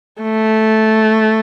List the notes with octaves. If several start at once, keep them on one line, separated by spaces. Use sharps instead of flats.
A3